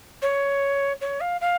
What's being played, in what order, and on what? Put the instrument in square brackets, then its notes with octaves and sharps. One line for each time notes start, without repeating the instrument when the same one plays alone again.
[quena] C#5
C#5
F5
F5